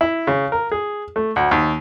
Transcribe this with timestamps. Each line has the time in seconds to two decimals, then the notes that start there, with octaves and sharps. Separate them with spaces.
0.01 E4
0.27 C#3
0.52 A#4
0.72 G#4
1.16 A3
1.36 D2
1.51 D#2